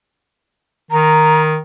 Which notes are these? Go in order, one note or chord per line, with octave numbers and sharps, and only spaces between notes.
D#3 A#5